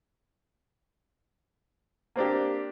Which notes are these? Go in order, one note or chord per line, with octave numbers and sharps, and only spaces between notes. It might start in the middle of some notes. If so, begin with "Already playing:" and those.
A#3 C4 D4 G4